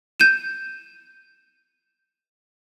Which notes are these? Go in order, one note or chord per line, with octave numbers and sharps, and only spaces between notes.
G6 D#7 E7